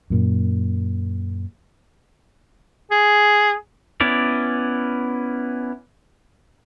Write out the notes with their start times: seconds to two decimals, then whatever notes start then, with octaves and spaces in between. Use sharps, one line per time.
0.10 F#2 A#2
2.91 G#4
4.01 B3 C#4 E4 D5